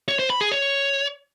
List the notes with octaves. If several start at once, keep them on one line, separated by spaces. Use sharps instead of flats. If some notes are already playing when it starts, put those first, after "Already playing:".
C#5
C5
B5
G#4
C#5